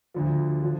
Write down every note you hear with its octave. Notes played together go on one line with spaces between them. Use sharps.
D2 D3 F3
D3 F3